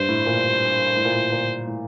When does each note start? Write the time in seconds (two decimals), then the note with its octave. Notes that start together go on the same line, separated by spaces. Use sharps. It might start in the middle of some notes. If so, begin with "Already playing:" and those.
Already playing: G2 G3 C5
0.09 A2
0.26 A#2
0.96 A2
1.05 A#2
1.14 A2
1.32 A#2
1.67 A2